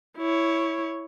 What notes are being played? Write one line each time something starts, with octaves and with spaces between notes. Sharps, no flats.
E4 C#5